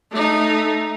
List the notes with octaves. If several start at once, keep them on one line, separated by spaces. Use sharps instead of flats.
A3 D#4